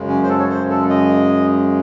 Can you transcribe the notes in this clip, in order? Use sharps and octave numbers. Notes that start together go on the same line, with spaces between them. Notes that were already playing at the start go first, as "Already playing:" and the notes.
Already playing: F#2 C#3 G#3
C#4
C5
A4
C#5
C5
A4
D#5